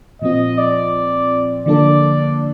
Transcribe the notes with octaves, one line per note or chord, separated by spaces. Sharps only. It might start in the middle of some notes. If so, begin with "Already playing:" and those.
A#2 F3 C4 F4 D#5
D5
D3 F3 A#3 D4 A4 D5